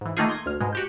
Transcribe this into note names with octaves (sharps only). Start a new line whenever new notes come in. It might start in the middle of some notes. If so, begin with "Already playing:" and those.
G#2 E3
D#3 A3 A#3 D#4 F4 G#4
C6 D#6 G#6
D2 F6
G#2 B2 G#3
F#4 G4 G6